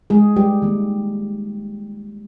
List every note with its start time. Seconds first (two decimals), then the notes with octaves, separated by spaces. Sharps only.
0.10 G#3 G#4
0.36 G3 G4
0.62 D#3 A#3